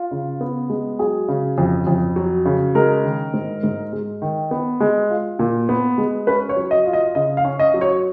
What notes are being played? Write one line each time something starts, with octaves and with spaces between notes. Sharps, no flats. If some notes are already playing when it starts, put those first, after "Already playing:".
Already playing: F4
C#3
B3
G#3
F#3 G#4
C#3
F2
F2
F#3
C#3
G#3 A#4
D#3
G#2
G#2
G#3
D#3
B3
G#3
F4
A#2
B3
G#3
C#4 B4
C#5
F#3
D#5
F4
D#5
C#3 D#5
F5
C#4
D#5
F#3
C#5